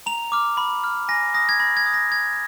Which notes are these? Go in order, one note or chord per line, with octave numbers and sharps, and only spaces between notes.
A#5 F7
D6 F6
B5
F6
G#5 A#6
D#6 F#6 A#6
G#6
B5 A#6
G#6
D#6 F#6
A#6
B5 G#6